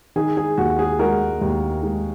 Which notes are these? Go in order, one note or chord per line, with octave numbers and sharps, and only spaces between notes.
D#3 G#4
G#4
D#2 F#4
G#4
G#3 F#4 A#4
D#2
G#3